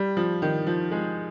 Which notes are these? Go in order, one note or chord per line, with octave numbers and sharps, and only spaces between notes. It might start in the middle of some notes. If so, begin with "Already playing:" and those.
Already playing: G3
F3
D#3
F3
G#3